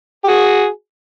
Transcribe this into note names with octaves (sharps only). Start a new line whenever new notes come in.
G4
F#4 G#4